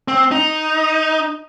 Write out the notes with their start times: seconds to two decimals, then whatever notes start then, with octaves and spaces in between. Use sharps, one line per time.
0.08 C4
0.31 D#4